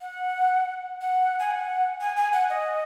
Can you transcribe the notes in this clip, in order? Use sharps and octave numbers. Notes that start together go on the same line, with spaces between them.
F#5
F#5
G#5
F#5
G#5
G#5
F#5
D#5